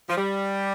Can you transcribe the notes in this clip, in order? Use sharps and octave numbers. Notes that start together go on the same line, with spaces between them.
F3
G3